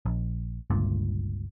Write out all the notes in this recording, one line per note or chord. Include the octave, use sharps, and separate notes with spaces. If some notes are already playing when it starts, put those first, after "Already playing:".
A#1
G1 C#2 G2 A#2